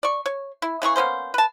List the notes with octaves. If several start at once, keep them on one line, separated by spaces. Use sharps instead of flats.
D5 C#6
C#5
E4
C#3 E3 G#4 C#6
A#3 B3 C#4 C5
B4 A5